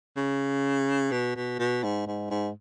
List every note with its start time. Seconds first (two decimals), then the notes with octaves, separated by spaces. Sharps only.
0.17 C#3
1.12 B2
1.36 B2
1.59 B2
1.83 G#2
2.07 G#2
2.31 G#2